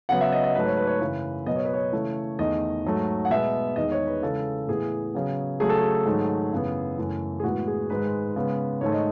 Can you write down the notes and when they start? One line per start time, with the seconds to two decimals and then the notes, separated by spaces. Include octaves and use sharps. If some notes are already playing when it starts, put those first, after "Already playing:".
0.09 C#3 F#3 B3 F#5
0.21 E5
0.32 D#5
0.44 D#5
0.55 G#2 F#3 A3 B4
0.66 C#5
0.77 B4
0.87 C#5
0.99 F#2 C#3 E3 B4
1.46 B2 F#3 B3 D#5
1.56 C#5
1.65 B4
1.74 C#5
1.92 C#3 E3 A3
2.38 E2 D#3 A3 D#5
2.84 G#2 F#3 A3
3.25 F#5
3.30 B2 G#3 B3 E5
3.76 E2 D#3 G#3 D#5
3.92 C#5
4.07 B4
4.22 C#3 E3 G#3 A4
4.68 A2 E3 B3 G#4
5.14 C#3 F#3 B3
5.60 C#3 F#3 A3 G#4
5.69 A4
5.79 G#4
6.06 G#2 D#3 F#3 A3
6.51 F#2 C#3 E3 B3
6.99 F#2 C#3 E3 A3
7.40 G#4
7.43 A2 E3 G#3 B3 F#4
7.67 G#4
7.90 G#2 D#3 G#3 B4
8.36 C#3 G#3 B3
8.81 G#2 D#3 A3 C#5
8.92 D#5